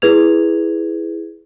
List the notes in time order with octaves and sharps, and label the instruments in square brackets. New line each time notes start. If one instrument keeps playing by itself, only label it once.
[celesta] E4 G#4 B4 G#6 F7